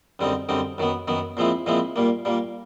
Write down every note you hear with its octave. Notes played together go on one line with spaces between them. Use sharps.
F#2 D3 G3 C4 D#4
F#2 D3 G3 C4 D#4
F#2 D#3 F#3 B3
F#2 D#3 F#3 B3
A#2 F3 G#3 C4 E4
A#2 F3 G#3 C4 E4
A#2 G3 A#3
A#2 G3 A#3